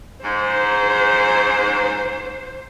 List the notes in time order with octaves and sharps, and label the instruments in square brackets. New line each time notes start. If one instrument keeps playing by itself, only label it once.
[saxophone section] G#2 [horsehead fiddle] C5